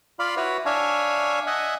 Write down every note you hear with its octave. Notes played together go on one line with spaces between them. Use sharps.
F4 D5 F5 B5
E4 F#4 B4 C#5
D4 C#5 E5 F5 G#5
D#5 E5 F#5 G#5